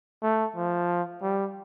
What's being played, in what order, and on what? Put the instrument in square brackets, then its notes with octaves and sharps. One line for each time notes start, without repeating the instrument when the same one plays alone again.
[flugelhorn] A3
F3
G3